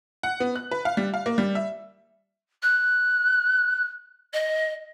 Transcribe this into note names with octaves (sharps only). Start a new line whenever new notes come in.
F#5
B3
F#6
B4
F5
G3
F5
A#3
G3
E5
F#6
D#5